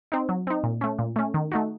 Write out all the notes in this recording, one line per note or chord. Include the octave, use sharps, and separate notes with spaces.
C4 D#4
F#3
C4 D#4
A#2
A3 C#4
A#2
A3 C#4
D#3
A3 D#4 F#4